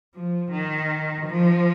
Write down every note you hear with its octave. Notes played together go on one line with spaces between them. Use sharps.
F3
D#3
F3